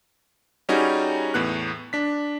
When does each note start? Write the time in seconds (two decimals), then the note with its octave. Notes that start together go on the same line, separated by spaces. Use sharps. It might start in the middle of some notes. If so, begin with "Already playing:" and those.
0.69 G3 C#4 D#4 F#4 G#4
1.34 E2 A2 B3 F#6
1.93 D4 B6